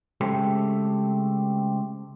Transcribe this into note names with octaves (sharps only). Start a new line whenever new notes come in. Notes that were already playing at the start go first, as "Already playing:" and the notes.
C#3 G#3 A3 C4 G4 A4